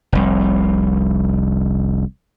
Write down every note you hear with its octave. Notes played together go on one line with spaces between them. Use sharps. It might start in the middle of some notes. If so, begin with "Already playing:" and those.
F1 C2